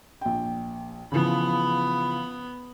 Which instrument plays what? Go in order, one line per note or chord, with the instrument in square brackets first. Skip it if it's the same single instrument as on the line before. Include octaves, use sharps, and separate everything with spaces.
[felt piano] A#1 G5
[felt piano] C#3 E3 F3 [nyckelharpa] B3 B5